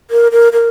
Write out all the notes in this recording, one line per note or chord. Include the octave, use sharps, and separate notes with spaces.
A#4
A#4
A#4